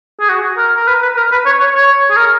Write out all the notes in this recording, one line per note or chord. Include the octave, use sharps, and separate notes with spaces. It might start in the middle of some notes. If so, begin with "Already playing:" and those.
G#4
F#4
A#4
A#4
B4
B4
A#4
B4
C#5
C#5
C#5
G#4
A#4